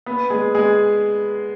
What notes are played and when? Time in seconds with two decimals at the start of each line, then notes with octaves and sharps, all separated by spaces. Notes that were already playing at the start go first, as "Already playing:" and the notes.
0.06 B3 B4
0.30 G#3 G#4
0.55 G#3 G#4